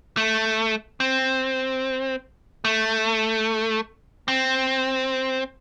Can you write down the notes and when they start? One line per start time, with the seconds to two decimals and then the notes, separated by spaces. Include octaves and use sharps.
0.17 A3
1.00 C4
2.65 A3
4.28 C4